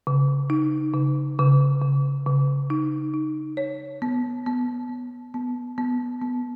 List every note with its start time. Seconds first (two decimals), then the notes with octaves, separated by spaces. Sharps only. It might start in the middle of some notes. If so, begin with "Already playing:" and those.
0.07 C#3
0.50 D#4
0.94 C#3
1.39 C#3
1.82 C#3
2.27 C#3
2.70 D#4
3.14 D#4
3.57 C#5
4.02 B3
4.46 B3
4.89 B3
5.34 B3
5.78 B3
6.21 B3